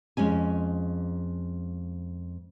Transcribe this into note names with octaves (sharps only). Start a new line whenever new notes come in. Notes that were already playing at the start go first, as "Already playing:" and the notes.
F2 G#3 C#4 G#5